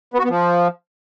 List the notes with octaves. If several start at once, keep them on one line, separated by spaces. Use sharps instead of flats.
B3
F#4
B3
F3